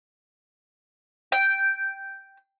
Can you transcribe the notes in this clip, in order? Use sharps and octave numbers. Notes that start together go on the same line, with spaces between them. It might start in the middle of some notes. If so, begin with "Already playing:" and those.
G5